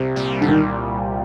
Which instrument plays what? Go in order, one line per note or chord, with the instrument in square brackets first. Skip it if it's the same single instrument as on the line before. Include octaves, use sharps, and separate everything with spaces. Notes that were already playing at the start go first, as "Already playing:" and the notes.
Already playing: [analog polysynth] C2 [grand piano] C3
[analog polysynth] A#2 G3
[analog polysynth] C2 [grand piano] D3
[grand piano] D#3